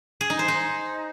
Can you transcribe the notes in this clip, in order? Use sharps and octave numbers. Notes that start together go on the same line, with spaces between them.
G#4
D#4
C5
D#4